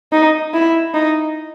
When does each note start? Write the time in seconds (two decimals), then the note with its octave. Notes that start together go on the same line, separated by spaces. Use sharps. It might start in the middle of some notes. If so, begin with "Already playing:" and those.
0.12 D#4
0.54 E4
0.94 D#4